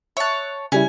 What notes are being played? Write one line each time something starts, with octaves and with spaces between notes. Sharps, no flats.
C#5 E5 A5 F#6
C#3 G3 C#4 E4 G#5